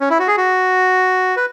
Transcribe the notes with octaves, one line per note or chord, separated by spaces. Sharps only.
C#4
E4
F#4
G#4
F#4
B4